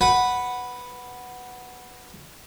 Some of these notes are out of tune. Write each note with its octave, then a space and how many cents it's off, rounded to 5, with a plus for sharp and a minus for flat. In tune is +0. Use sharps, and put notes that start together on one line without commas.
B4 +0 F#5 +0